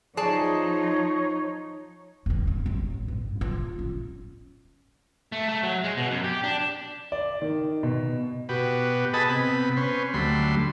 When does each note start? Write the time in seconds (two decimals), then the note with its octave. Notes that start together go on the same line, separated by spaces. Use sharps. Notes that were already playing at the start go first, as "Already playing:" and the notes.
0.17 F3 D#4 G#4 C#5 D5 A5
2.26 E1 D#2
2.47 E2 G2
2.66 A1
3.08 G2
3.41 F4
3.79 C#4
5.32 A3
5.49 A3
5.63 F#3
5.84 G#3
5.97 B2
6.11 F#2
6.24 G4
6.44 D4
7.12 D5
7.42 D#3
7.83 B2
8.49 B2 F#4 G4 B4
9.14 G#4 A4 B4 D#5 A5 B5
9.29 C3 B3 B5
9.77 C#4 B4 C5
10.14 D2 F#3 G3 A3 B5 C6